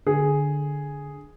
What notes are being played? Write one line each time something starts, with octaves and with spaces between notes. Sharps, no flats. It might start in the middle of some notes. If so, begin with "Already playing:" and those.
D3 G#4